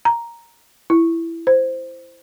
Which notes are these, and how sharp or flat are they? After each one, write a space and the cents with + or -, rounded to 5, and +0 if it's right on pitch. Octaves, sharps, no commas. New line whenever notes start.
A#5 +5
E4 +10
C5 -5